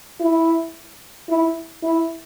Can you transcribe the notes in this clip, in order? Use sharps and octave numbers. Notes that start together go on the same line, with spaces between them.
E4
E4
E4